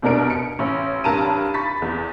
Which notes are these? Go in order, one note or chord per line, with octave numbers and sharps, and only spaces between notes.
C2 B2 D4 A#4 D7
C#7
A1 C#4
A1 G2 A#4 A5 A#5 D#7
B5 C#6 A6 B6
E2